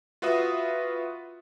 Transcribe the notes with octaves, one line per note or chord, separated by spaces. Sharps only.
F4 F#4 B4 E5 D#6